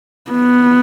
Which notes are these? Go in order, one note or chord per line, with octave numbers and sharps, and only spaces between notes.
B3